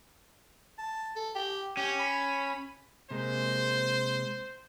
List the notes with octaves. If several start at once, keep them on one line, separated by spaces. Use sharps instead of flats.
A5
A4
G4
C#4 G4
B5
C3 G#3 A#3 C5